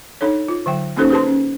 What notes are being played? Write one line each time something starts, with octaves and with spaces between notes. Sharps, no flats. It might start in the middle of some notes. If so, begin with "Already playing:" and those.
D4 D#4 A4 C#5
F4
D3 F#3 G5
A#3 C#4 D#4 F#4 A4 C5
G4 G#4 B4 C5 A5 C6
C#4